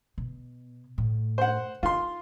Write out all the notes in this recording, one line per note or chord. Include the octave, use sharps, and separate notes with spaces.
B2
A2
C5 F#5
D#4 F4 C6